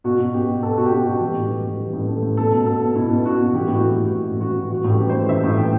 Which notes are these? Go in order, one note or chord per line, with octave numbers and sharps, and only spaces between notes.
B2 F#4
B2
B2 G4
B2
B2 A4
B2 F#4
G4
B2 F#4
B2 F#4
E3 G4
A2
E3
A2
E3 G4
A2
E3 A4
A2
B2 A4
B2
B2 A4
B2
B2 E4
B2
B2 F#4
B2
E3 G4
A2 E4
F#4
E3 G4
A2
E3
A2
E3 F#4
A2
E3 F#4
A2 G4
E3
C5
A2
E3 E5
A2
E3 G5